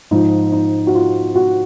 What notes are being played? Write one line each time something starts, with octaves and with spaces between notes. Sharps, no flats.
G#2 F3 D#4
D#4
F#4
F4
F#4